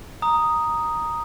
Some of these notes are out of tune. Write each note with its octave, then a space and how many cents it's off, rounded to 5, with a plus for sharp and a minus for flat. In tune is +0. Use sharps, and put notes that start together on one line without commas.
A#5 +0 D#6 +0